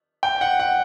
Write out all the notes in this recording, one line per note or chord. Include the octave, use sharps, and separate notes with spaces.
G5
F#5
F#5